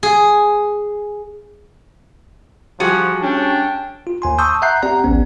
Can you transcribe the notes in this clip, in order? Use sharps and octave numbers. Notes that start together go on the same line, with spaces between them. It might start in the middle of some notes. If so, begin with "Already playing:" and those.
G#4
F3 G3 F#4 G#4
C#4 D4 G5
F4
D#2 G#5 C6
A5 C6 C#6 D#6 E6 G6
E5 F#5 A#5 F#6 G6 C7
C4 G4 D5 F#5 A#5
A1 D2 B3 C#4